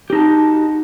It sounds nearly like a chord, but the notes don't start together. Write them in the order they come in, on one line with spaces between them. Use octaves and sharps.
G4 D#4 A5 F#4